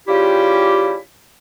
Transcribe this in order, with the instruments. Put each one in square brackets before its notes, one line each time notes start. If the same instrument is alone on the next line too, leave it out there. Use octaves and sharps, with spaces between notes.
[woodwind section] C#3 G3 E4 F4 G4